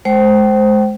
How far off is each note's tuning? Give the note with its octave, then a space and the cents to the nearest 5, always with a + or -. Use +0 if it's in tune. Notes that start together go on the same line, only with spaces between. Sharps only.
G#3 +30 C5 +0 G5 -35